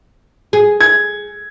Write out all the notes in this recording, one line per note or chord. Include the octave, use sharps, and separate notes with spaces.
G#4
G#6